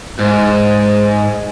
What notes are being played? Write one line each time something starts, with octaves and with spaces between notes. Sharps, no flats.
G#2